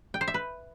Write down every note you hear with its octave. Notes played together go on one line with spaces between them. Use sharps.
G5
C5
E5
B4